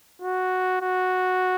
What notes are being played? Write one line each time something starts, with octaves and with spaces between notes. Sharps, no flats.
F#4
F#4